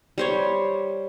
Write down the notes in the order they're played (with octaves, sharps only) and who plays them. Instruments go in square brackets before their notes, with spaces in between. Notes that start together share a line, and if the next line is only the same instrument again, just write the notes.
[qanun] G3 C5 C#5